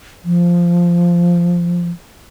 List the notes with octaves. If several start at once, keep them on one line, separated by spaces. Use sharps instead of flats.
F3